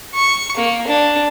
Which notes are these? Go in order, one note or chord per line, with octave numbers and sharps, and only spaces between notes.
C#6
A#3
D4